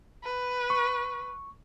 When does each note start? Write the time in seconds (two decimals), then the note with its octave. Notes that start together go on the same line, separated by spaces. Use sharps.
0.23 B4
0.70 C#6